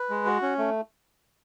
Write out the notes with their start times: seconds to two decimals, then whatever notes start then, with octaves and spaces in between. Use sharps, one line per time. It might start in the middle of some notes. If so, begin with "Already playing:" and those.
Already playing: B4
0.10 G#3
0.26 F#4
0.42 C#4
0.58 A3